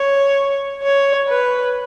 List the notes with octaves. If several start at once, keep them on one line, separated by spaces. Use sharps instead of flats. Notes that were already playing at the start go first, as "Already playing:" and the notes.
Already playing: C#5
C#5
B4